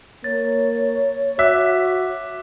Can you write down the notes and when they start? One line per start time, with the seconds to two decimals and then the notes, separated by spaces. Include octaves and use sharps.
0.24 A#3 C#5 A6
1.39 F#4 E5 D6 F#6 B6